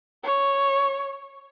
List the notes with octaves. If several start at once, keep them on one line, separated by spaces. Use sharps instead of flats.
C#5